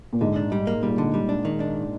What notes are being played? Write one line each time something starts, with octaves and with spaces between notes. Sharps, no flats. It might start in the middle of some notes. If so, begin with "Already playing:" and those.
A#2
G#2 D3
D4
G3
A#3
A#2 G3
D3
G3
D4
D#3
D4